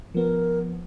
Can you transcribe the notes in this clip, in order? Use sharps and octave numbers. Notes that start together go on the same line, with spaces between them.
F3 B3 A#4